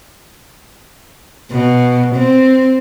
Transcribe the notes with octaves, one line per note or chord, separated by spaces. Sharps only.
B2
C4